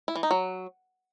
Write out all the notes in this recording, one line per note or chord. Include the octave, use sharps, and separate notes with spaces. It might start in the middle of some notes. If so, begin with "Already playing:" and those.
E4
E3
D#4
F#3